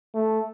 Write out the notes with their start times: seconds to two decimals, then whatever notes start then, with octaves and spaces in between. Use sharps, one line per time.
0.15 A3